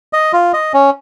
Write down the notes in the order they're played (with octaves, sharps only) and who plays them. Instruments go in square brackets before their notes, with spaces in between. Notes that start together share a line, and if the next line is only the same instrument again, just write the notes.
[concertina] D#5
F4
D#5
C#4